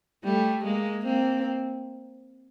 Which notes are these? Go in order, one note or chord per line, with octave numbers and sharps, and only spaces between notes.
G3 A3
G#3 A#3
A#3 C4